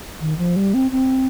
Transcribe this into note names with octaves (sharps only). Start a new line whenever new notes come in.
D#3
F3
G3
C4
C4